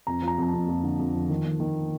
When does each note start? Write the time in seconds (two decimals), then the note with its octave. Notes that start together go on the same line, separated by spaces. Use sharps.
0.07 F2 A#5
0.22 F3
0.28 A#5
0.38 F2 A#5
0.48 A5
0.54 F2
0.69 F2
0.83 D3
0.99 F2
1.15 F3
1.29 D#3
1.45 D#3
1.60 D#3